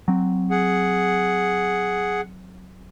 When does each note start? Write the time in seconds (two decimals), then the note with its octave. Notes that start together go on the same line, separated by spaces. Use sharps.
0.08 F#3 C4
0.51 G#4 F#5